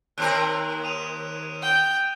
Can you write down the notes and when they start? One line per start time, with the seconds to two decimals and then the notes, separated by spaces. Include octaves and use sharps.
0.18 D#2 C4 A#4 F#6
0.84 D#6 D#7 F7
1.62 G5